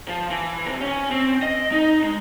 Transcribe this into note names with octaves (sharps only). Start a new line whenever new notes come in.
F3
E3
C3
C#4
C4
D#5
D#4
G#3